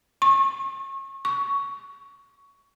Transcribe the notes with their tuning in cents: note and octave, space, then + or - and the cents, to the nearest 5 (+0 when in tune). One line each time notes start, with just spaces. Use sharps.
C#6 -35
C#6 +10